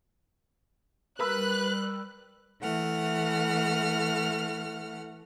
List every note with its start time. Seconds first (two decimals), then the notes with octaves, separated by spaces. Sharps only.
1.20 G3 A#4 B4 B5 E6 F#6
2.61 E3 A3 F#5 F6